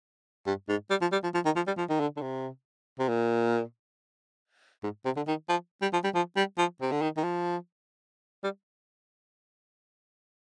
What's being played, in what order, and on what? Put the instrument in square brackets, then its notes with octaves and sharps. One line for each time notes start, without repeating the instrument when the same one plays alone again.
[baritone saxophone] G2
G#2
G3
F3
G3
F3
F3
D#3
F3
G3
F3
D#3
D3
D3
C3
C3
A#2
G#2
C3
D3
D#3
F3
G3
F3
G3
F3
G3
F3
C3
D3
D#3
D#3
F3
G3